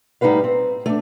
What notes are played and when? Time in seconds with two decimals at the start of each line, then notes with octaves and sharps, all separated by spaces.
0.21 A2 G3 D#4 F4 B4 F5
0.44 C4
0.86 A3 D4